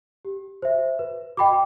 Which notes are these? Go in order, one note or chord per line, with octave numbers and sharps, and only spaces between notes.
G4
C5 E5
B4
D#5 G5 B5 D6